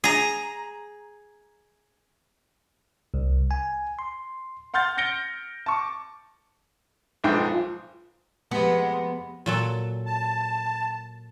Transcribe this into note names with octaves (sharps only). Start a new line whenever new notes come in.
G#4 A#5
C2
G#5
C6
F#5 C6 F6 G6 A6
A6 A#6 C#7 D7 G7
A5 C#6 D6
B1 G#2 F3 F4 G#4 G5
F2 C3 G#3 B3
A#2 F#3 A4
A5